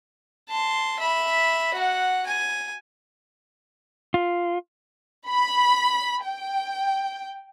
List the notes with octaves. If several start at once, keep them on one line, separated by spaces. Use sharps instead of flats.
A5 C6
E5 B5
F#4 F#5
G#5
F4
B5
G5